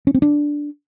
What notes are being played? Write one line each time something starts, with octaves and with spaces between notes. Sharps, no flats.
C#4
C4
D4